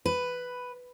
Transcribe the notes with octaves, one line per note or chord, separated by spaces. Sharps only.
B4